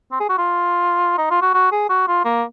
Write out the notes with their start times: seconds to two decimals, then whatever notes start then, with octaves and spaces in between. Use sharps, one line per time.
0.12 C4
0.20 G#4
0.29 F#4
0.38 F4
1.18 D#4
1.31 F4
1.42 F#4
1.54 F#4
1.72 G#4
1.89 F#4
2.08 F4
2.25 A#3